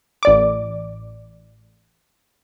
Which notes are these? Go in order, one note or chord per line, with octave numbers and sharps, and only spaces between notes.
A1 D5 D6